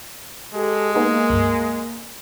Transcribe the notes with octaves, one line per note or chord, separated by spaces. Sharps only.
G#3 G4 A4
A#3 B3 D#4 G#4
C#2 G2